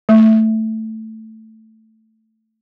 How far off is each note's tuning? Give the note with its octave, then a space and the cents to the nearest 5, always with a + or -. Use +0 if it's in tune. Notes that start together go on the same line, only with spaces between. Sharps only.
A3 +5